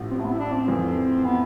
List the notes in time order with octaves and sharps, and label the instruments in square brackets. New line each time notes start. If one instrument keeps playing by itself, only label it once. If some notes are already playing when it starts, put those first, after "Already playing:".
Already playing: [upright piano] A1 A2 F3
[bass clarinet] C4
A3
B3
E4
D4
C4
[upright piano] F2 E3 A3
[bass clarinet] B3